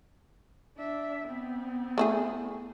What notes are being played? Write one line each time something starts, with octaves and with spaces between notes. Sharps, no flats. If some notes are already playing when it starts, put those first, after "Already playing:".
D4 E5
B3 C4
A3 E4 G#4